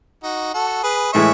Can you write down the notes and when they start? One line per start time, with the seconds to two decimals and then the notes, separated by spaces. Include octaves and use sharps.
0.23 D#4 F#4
0.54 F#4 A4
0.83 G#4 B4
1.13 A2 E3 G#3 C#5 E5